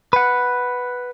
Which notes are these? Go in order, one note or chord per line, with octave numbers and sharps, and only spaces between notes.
B4 F#5